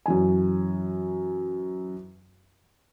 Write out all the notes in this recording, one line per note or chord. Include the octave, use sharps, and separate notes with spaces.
F#2 E3 G#5